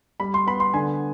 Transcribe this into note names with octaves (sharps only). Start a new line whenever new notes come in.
G3 B5
C6
B3 B5
C6
D3 G#5